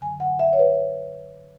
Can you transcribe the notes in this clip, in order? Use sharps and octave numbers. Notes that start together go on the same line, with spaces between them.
F#2 D3 F#3 G#5
F#5
E5
C#5
B4